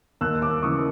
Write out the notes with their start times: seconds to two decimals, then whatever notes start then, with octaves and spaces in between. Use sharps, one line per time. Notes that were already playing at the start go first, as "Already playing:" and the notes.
0.21 D#2 E6 F#6
0.42 D6 E6
0.63 C#3 E3 C#6 D#6